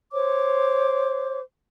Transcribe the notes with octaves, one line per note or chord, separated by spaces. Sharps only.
C5 C#5 D6